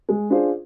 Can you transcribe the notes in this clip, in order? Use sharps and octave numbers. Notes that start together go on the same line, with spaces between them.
G#3
D4 F4 G#4 C5